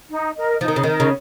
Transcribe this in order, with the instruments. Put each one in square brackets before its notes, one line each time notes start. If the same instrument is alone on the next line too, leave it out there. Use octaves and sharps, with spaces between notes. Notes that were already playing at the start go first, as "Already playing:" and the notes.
[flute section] D#4
A#4 D#5
[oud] F3 [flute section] D#4
[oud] D#3
C#3
[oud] D#3 [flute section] A#4 D#5
[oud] C#3